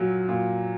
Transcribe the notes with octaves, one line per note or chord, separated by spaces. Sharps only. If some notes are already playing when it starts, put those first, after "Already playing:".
Already playing: A#2 F#3
A#2